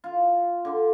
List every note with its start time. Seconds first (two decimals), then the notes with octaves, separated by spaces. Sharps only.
0.04 F4
0.65 D3